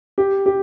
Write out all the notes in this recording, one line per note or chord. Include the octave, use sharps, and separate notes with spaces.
G4
G4